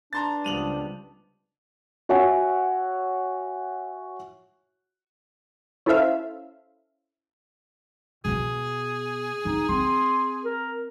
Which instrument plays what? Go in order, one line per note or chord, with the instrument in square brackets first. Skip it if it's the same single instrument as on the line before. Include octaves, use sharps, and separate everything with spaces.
[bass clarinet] D4 [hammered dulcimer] B4 A5 [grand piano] A#5 C6 A6
[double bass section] C#2 G3 [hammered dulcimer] D3 F3 B3 [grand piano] D#7 F7 F#7
[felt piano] F#4 C#5 E5 F#5 G#5
[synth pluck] C#4 E4 A4 C5 E5 F5
[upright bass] B2 B3 [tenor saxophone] G#4
[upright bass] D#3 [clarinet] D#4
[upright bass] C4 [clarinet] C6
[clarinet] A#4